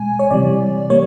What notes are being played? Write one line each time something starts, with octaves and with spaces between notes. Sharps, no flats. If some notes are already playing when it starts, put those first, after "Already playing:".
Already playing: B2 G#3 G#5
C#5
C3 E3 G3 D5
G3 A#3 C#5